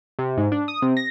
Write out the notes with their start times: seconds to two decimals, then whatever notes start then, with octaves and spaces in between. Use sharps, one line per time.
0.19 C3
0.37 G#2
0.52 D4
0.68 D#6
0.82 C3
0.97 A#6